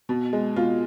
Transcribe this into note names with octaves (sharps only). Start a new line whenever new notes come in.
B2
G#3
B2 F4